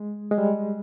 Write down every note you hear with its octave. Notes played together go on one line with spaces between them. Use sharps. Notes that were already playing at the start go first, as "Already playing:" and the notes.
Already playing: G#3
G#3
G3